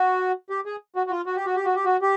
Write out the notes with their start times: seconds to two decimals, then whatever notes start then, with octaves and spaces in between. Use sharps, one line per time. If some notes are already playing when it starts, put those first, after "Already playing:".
Already playing: F#4
0.50 G4
0.66 G#4
0.96 F#4
1.07 F#4
1.11 F4
1.26 F#4
1.36 G4
1.46 F#4
1.56 G4
1.65 F#4
1.75 G4
1.85 F#4
2.02 G4